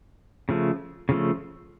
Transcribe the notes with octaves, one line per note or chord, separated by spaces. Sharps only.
C#3 F3 A3
C#3 F3 A3